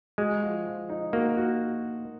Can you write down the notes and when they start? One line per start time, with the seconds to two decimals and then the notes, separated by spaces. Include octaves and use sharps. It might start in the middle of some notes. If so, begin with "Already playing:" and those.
0.18 G#3 F#4
0.42 F3
0.66 F3
0.89 D#4
1.13 A#3 F#4
1.37 F#4